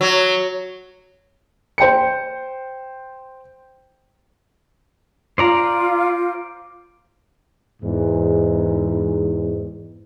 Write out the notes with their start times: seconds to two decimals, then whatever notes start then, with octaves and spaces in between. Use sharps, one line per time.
0.01 F#3
1.78 C5 G5 C#7
5.38 F4 C5 D5 A#5
7.83 E2 G#2